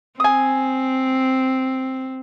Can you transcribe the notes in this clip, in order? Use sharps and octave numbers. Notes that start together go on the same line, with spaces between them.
C4 G#5 D#6